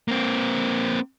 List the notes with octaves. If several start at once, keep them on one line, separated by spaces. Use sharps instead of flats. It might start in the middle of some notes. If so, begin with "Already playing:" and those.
A#3 C4